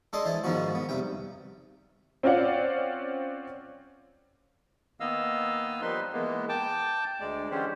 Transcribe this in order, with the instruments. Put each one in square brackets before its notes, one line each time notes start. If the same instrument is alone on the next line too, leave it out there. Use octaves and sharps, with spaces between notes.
[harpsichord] G#3 D4 A4 D#5 C6
E3 C5 A5
G#2 D#3 F3 B3 F#4
B3
G2 C3 G5
[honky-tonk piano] C4 C#4 F4 D5 F5 F#5
[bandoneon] D#3 A#3 B3 D#5 F5 E6
F3 G3 D#4 B4 C6
E3 G#3 A#3 B3
G5 A5 D6
D2 G#3 D5
D3 E3 G#3 C#4 G4 C5